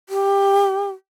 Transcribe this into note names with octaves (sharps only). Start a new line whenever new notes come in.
G4